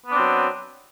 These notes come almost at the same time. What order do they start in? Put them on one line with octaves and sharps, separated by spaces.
B3 D4 C4 F#3